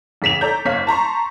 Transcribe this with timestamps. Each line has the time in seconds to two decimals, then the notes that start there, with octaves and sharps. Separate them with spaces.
0.22 A1 C#3 B6 E7 F7
0.41 A4 C#5 D5 A#5 G6
0.65 F#1 C#5 F5 B6
0.87 A5 A#5 C6 C#6